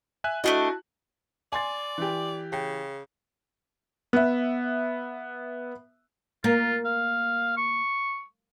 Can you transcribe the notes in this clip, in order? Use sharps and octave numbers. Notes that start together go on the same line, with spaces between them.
E5 G#5 F#6
A3 D4 E4 F#4 D#5
D5 G#5 C6 A6
E3 G4
C#3 G5
B3 E5
A#3 F4
F5
C#6